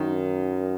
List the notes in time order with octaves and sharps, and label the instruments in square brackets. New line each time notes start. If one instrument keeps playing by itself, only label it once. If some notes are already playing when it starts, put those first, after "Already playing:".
Already playing: [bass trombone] F#2 [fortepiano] D#3